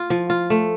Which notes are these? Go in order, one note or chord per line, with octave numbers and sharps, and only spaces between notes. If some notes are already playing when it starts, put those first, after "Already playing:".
Already playing: F4
F3
F4
A3